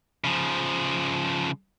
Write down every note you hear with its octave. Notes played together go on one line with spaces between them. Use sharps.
C#3 F3